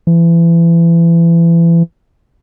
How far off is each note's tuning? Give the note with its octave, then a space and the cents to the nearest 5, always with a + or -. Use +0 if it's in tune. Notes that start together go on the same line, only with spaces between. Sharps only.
E3 +30